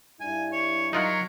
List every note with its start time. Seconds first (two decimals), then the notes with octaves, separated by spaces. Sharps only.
0.20 G2 E4 G#5
0.52 C#5
0.93 F#3 D#4 F4 A#4 F#5